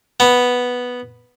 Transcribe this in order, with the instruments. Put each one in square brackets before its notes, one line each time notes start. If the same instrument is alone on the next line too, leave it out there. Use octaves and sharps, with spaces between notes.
[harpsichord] B3